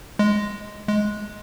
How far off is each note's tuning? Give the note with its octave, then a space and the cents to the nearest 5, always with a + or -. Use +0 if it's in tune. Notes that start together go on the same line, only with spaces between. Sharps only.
G#3 +0
G#3 +10